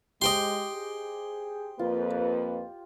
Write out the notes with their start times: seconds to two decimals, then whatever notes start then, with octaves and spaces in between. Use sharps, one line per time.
0.22 G#3 G4 C5 D#5 G5 C6 D6
0.73 G#4
1.79 F2 A#3 F4 B4